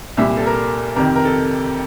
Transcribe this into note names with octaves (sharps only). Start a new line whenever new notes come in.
C2 A#2 G3 E5
A4
A#4
F2 C3 D#3 A#4
A#4
A4